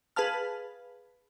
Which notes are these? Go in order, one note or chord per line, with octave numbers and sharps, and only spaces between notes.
G#4 B4 F5 A5 F6